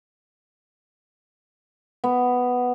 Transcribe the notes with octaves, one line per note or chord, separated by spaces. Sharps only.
B3